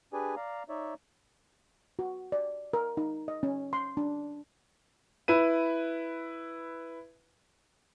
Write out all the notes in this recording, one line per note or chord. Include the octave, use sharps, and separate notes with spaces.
D4 G4 G#4 B4 D5 G#5
D5 F5 A#5
D#4 C#5 D5 E5
F#4
D5
A#4
D#4
D#5
C#4
C6
D4
E4 B4 D#7